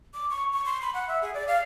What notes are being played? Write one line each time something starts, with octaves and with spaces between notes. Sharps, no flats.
D6
C#6
C#6
C6
B5
F#5
E5
G#4
D5
F5